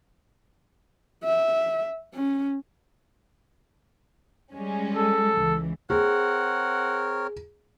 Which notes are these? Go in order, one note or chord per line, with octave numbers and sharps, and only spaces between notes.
E5
C#4
G3 G#3 C#4
A4
C#2 E3
C4 G#4 A#4 C#5 F#5